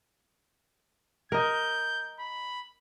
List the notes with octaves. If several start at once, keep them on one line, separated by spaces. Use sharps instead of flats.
A#4 D#5 G6
B5